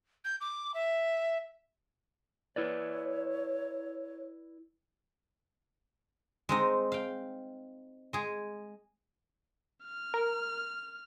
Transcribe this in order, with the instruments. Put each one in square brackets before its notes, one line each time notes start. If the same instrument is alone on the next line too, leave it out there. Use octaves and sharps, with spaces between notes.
[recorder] G6
D6
E5
[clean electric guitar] E4 B4 D5 [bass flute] C#5
[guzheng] G#3 C4 D#4
F5 G5
G#3 G#4
[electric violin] F6
[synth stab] A#4